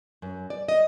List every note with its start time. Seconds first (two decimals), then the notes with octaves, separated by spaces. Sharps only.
0.22 F#2
0.50 D5
0.68 D#5